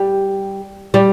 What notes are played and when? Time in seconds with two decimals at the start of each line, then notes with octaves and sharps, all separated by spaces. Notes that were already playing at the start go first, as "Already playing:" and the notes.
Already playing: G3
0.94 G3